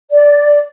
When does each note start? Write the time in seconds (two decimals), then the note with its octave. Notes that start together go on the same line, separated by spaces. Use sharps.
0.11 D5